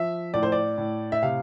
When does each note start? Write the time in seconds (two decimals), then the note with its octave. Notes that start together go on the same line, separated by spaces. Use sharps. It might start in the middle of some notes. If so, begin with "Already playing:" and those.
Already playing: F3 E5
0.34 A2 D5
0.43 C5
0.52 D5
0.78 A2
1.12 E5
1.22 C3 F5